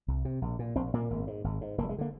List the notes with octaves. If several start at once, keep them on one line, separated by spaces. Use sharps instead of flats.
C2
C3
A#1
A#2
A#1 C4
A#2 A#3
G#1
G#2
G#1
G#2
F1 A#3
G3
G#3
D3 A#3